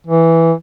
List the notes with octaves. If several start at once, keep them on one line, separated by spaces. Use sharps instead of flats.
E3